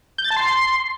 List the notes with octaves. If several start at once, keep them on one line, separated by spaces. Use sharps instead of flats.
G6
A6
A5
C6